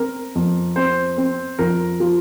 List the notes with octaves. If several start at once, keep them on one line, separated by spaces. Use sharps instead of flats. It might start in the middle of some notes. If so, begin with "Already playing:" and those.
Already playing: C4 A#4
F2
C4 C5
C4
F2 A#4
F3